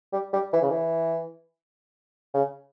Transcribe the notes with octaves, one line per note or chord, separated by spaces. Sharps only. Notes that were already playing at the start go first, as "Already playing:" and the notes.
G3
G3
E3
C#3
E3
C#3